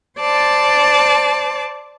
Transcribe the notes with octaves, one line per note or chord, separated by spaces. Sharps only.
C5 D5 A5 D6